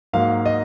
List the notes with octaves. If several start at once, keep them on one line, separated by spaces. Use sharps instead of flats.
G#2 F#3 A#3 F5
D#5